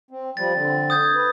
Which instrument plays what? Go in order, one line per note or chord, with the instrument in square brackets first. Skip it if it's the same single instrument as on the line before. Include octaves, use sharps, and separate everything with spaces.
[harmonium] C4
[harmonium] F3 G3 [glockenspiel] A6
[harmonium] D3 C4
[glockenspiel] D#6 G6 G#6
[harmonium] B4